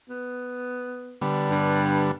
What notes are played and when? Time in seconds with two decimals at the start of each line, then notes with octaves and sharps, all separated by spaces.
0.10 B3
1.21 D3 G3 B3
1.50 G2